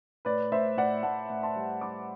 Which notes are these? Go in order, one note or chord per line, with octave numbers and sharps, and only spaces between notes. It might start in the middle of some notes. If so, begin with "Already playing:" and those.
A2 B4 D5
A2 C5 E5
A2 D5 F#5
A2 F#5 A5
A2
A5 C6
G3
G3 B5 D6